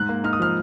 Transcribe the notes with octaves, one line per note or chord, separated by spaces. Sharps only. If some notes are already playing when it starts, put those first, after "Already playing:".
Already playing: G#2 F#6
A#3
D#4 F6
D#6
F3 F6